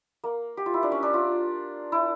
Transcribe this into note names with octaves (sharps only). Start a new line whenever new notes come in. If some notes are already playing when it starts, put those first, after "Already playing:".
A#3
G4
F4
E4
D4
C#4
D4
F4
E4